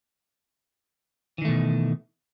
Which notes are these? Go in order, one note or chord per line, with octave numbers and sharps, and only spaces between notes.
B2 D#3 E3 A3